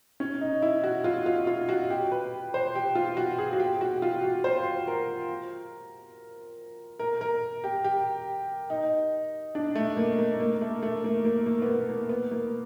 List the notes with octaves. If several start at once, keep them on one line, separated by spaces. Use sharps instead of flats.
C#4
D#4
E4
F#4
F4
F4
F4
F#4
G4
B4
C5
G4
F4
F#4
G#4
F#4
G4
F#4
F4
F#4
C5
A#4
A#4
A#4
G4
G4
D#4
D4
A3
A#3
A#3
A#3
A3
A3
A#3
A#3
A#3
B3
A#3
A#3
B3
A#3